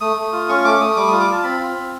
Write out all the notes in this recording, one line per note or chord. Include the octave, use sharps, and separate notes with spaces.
A3 D#6
A3
F4
C#4 C#6
A3 D6
A3 D#6
G3 D6
F4 D#6
D6
F4 A5
C4 B5
F4
C4